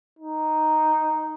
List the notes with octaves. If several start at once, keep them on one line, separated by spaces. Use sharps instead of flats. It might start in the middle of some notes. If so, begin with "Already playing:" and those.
D#4